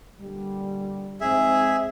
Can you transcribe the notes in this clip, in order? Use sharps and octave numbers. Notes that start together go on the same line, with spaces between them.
A#2 D3 G3
F2 G#2 C4 G#4 E5